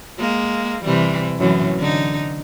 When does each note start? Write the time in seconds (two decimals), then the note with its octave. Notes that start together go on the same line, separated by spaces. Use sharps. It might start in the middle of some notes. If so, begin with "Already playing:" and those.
0.19 G#3 A#3
0.84 C3 E3 G3
1.39 F#2 A2 E3
1.78 D3 D#4